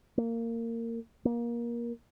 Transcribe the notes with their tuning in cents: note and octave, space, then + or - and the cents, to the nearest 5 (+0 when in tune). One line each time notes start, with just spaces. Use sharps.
A#3 -20
A#3 +20